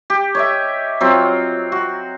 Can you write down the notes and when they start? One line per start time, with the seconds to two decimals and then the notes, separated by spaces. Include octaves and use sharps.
0.10 G4
0.35 C#5 D#5 E5
1.01 F#3 C4 F4
1.72 F#4